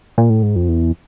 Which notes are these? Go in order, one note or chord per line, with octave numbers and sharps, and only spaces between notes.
A#2
A2
G#2
F2
E2